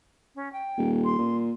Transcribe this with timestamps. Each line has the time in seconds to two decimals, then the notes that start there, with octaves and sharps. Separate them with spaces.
0.35 C#4
0.52 G5
0.78 D#1
1.04 C6
1.19 A#2